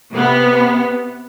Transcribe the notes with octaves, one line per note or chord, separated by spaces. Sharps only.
C3 B3